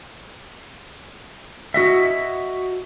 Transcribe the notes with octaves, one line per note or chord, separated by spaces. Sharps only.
F#4 D#5 E5